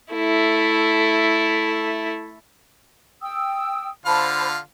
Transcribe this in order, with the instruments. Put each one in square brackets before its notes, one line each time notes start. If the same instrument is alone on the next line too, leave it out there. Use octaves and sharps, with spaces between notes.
[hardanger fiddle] A3 E4
[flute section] G5 D#6 E6
[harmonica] D3 F4 F5 [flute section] C5 A5 B5